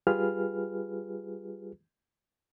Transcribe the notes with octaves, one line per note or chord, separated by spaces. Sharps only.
G3 F4 G4 G#4 B4 F6